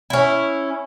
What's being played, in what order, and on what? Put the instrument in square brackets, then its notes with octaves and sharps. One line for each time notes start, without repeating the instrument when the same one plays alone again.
[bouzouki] C#4 E4